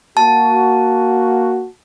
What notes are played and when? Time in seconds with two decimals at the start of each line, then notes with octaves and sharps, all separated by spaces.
0.17 A#3 F#4 A5